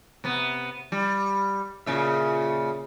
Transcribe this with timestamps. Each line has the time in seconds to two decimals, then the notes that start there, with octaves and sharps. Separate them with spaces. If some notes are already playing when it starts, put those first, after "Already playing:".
0.24 C3 B3
0.92 G3
1.86 A#2 C#3 E5